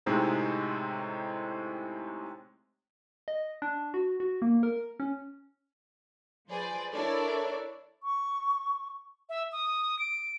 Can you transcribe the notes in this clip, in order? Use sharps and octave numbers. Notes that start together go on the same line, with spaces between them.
A2 C3 G#3 C4 D#4
D#5
D4
F#4
F#4
A#3
A#4
C#4
F3 G#4 B4 C5 D5
D4 E4 A4 A#4 C#5 D5
C#6
E5
D#6
D7